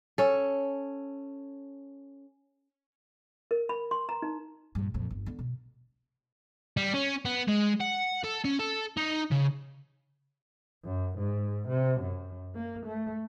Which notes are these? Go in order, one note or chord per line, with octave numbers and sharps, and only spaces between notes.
C#4 A4
A#4
B5
C6
A#5
D#4
G2 A#2
F2 A#2
G1
D3 B3
B2
G3
C#4
B3
G#3
F#5
A4
C#4
A4
D#4
C#3
F#2
G#2
C3
F#2
A#3
A3